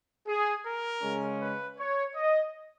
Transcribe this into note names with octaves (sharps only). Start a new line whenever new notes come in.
G#4
A#4
C#3 G#3 C#4
B4
C#5
D#5